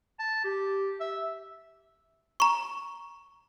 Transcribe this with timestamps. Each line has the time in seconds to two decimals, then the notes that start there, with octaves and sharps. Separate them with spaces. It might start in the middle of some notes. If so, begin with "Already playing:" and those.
0.19 A5
0.44 G4
1.00 E5
2.40 A#5 C#6